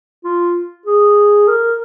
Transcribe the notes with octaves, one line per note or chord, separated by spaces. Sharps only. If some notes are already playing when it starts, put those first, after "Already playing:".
F4
G#4
A#4